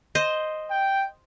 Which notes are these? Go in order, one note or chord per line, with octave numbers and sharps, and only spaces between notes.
C5 D#5
G5